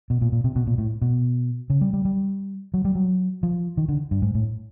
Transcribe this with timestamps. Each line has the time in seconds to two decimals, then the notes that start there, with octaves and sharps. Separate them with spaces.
0.10 B2
0.21 A#2
0.32 A#2
0.44 C3
0.56 B2
0.67 A#2
0.78 A2
1.02 B2
1.70 C#3
1.81 G3
1.93 G3
2.05 G3
2.74 F#3
2.85 G3
2.95 F#3
3.43 F3
3.77 D#3
3.88 D3
4.11 G2
4.22 G#2
4.35 A2